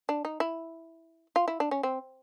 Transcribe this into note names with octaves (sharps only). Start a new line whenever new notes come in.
D4
D#4
E4
F4
E4
D4
C#4
C4